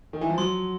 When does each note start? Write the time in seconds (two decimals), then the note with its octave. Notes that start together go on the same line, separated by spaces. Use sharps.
0.13 D#3
0.21 E3
0.30 F3
0.38 F#3 C6